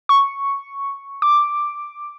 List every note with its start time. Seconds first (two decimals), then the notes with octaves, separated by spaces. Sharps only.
0.09 C#6
1.22 D6